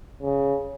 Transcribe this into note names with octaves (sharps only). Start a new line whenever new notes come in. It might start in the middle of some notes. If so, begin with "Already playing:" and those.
C#3